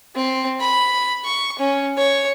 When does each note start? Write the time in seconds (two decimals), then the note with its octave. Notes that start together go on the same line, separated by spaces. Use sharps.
0.16 C4
0.60 B5
1.25 C#6
1.59 C#4
1.97 C#5